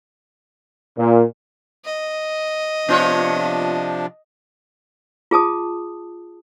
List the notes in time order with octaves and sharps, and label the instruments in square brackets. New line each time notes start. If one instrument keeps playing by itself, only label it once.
[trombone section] A#2
[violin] D#5
[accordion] C3 F3 D4 [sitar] B3 F4 C#5
[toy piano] F4 G#4 A5 D#6